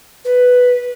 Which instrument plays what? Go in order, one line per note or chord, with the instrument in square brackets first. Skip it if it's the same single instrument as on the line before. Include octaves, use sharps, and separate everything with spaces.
[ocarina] B4